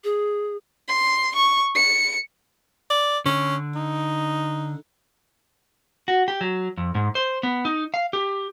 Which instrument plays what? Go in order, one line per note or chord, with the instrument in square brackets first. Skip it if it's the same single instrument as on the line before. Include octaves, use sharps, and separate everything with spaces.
[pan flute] G#4
[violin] C6
C#6
C#7
[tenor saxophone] D5
[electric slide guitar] D3 [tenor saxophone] C#4
[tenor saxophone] D#4
[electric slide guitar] F#4
G4
F#3
F2
G#2
C5
B3
D#4
F5
G4